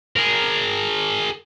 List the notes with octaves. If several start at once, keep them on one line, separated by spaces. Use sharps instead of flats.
G#4 A#4